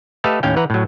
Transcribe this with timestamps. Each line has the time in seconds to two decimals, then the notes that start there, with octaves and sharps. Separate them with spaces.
0.24 A3 G4 A4 B4 D#5 F5
0.43 D#2 A2 C#4 F5 G5
0.56 E3 B4 F#5 A#5
0.70 A2 F#3